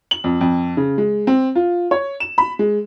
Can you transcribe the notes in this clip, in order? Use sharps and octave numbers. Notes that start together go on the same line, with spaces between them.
F#7
F2
F2
C#3
G#3
C4
F4
C#5
E7
B5
G#3